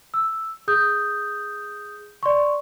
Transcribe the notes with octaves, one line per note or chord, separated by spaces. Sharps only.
E6
G#4 D#6 G6
D5 C6 C#6